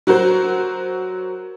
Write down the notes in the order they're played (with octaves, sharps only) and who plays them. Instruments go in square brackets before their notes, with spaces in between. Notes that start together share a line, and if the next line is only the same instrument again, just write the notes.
[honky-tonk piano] F#3 F#4 A#4 C5